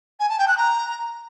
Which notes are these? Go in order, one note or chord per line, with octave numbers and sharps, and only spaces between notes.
G#5
A5
G5
F#6
A#5